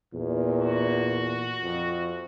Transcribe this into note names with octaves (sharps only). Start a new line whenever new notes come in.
E2 A#2
F#4
F2